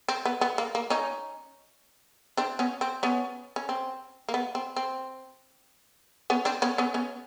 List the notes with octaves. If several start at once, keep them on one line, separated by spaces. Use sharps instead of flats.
C4
B3
B3
A#3
A#3
C#4 D#4
C4 D4
B3 C#4
C4
B3 C#4
C#4
C4
A#3
B3
C4
C4
B3 C#4
C4 D4
B3 C#4
B3 C#4
B3 C#4